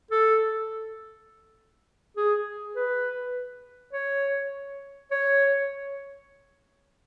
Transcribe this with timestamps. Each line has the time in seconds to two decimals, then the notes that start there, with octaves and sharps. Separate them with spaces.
0.11 A4
2.17 G#4
2.75 B4
3.93 C#5
5.11 C#5